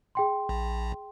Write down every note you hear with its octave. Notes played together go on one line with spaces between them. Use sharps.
G#4 G5 C6
A#1